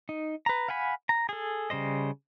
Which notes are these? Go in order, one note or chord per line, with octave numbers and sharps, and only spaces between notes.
D#4
B4 A#5
F5 F#5 G#5 B5
A#5
G#4 A4
C#3 G3 C5 D#5